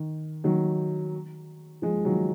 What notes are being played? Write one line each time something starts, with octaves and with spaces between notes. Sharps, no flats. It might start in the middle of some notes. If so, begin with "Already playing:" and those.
Already playing: D#3
D#3 F#3
F3 G#3
D#3 F#3